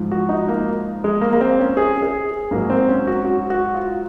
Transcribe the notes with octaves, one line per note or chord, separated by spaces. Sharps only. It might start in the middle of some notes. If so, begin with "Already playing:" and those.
Already playing: G#2 F3
F#4
D#4
A#3
G#3
A#3
A#3
C4
C#4
G#4
G#4
G#2 F#3 A#3
C4
C#4
F#4
F#4
F#4
F4